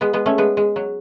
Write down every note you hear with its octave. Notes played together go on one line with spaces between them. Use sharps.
G#3 B3
G#3 B3
A3 C#4
G#3 B3
G#3
F#3